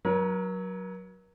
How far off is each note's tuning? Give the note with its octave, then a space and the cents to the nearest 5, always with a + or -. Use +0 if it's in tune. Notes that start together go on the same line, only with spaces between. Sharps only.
F#3 +0 A#4 +40